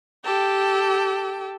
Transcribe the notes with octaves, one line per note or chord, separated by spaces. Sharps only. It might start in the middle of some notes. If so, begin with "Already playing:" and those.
G4 A4 G5